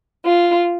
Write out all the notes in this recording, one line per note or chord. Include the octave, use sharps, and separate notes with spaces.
F4